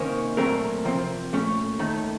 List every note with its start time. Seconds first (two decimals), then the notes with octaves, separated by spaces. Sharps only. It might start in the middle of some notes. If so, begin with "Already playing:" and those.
Already playing: C3 D#3 A#3 C#4 C5
0.37 A#2 F#3 A3 C4 A#4
0.85 C3 F3 C4
1.33 A#2 A3 C#4
1.79 D#2 D#3 A3